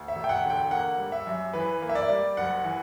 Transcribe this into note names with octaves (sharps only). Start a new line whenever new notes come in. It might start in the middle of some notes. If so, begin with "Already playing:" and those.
Already playing: D2
E5
E1
G5
F#5
D3
G5
A#3 F#5
G3
E5
F#2
E3 B4
A#3
E5
D5
G3
F#1 F#5
E3